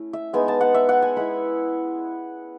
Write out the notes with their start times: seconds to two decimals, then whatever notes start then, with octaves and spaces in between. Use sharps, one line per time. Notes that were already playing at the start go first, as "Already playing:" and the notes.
Already playing: A3 C#4 E4
0.13 E5
0.33 G#3 B3 D#4 G#5
0.48 A5
0.61 F#5
0.74 E5
0.89 F#5
1.02 G#5
1.16 G#3 B3 E4 B5